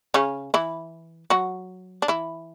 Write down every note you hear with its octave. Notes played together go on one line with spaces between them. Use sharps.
C#3 C#4
E3 E4
F#3 F#4
D4
E3 E4